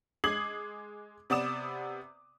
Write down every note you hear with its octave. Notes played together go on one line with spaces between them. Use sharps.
G#3 D6 D#6 G#6 C7 F#7
C3 B3 D5 D6 D#6 E7